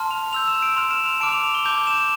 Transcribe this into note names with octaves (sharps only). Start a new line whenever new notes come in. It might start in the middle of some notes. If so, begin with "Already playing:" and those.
Already playing: A5 C6 F6
F7
C6 E6 G6 F7
E7
D7
C6 F6 F7
E7
F7
A5 D6 F6 D7
F7
F7
G7
A5 D6 G6 F7
E7